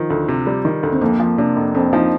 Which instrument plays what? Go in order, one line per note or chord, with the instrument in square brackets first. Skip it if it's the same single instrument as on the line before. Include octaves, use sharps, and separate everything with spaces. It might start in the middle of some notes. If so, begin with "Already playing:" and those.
Already playing: [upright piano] D#3 [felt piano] F3
[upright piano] D2
C3
G3
D#3
D2
[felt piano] C4
[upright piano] F2 [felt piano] A#3
[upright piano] F3
[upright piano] C3 [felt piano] D4
[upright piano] F1
[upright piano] F2 [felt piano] C4
[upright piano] F3 [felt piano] D#4